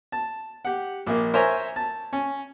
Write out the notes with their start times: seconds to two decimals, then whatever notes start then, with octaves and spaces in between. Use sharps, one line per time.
0.12 A5
0.65 G4 F#5
1.06 A#1 A#3
1.34 A#4 C5 C#5 E5 G#5 A#5
1.76 A5
2.13 C#4